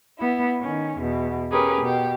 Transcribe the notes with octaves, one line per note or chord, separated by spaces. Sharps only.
B3 E4
D#3 C#4
E2 B2
C#4 G4 G#4 A#4 B4
B2 G4